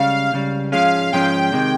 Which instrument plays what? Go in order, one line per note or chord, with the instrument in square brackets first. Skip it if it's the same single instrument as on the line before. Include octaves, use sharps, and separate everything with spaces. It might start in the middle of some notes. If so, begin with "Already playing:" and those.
Already playing: [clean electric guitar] C#2 C#3 G3 [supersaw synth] F5
[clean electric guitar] C#2 C#3 G3
[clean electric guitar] G#2 F3 G#3 C#4 G#4 [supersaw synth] F5
[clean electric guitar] G#2 F3 G#3 C#4 G#4 [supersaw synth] G5
[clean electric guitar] C3 D#3 G#3